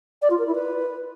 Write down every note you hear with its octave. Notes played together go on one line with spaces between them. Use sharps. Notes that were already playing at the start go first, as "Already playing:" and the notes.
D5
F4
A#4
E4
B4